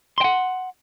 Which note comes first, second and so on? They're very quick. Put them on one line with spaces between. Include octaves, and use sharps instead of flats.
C6 G5 F#5